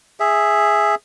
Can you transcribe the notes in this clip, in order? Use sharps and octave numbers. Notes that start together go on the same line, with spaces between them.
G#4 E5